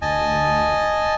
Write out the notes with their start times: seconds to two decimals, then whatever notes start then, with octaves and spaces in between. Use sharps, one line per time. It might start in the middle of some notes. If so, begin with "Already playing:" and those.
0.02 D2 D#5 G#5 A5